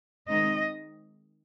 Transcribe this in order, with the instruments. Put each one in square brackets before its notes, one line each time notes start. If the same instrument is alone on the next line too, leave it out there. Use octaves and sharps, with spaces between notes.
[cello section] D#3 G#3 C4 D#4 D#5